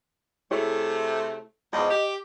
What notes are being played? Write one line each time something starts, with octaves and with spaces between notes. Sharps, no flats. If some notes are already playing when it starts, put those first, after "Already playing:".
C3 A3 E4 G#4 C#5
E2 G#2 F3 D#5
G4